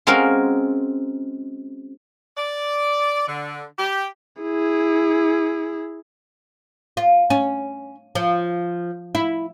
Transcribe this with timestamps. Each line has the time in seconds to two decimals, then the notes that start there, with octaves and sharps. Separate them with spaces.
0.07 G#3 C4 C#4 F#4 A#4 F5
2.38 D5
3.28 D3
3.79 G4
4.42 E4 G#4
6.97 F4
7.30 C#4
8.15 F3
9.15 E4